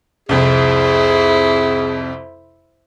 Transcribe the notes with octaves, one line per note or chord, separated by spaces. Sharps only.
C2 F2 E4 G#4 C5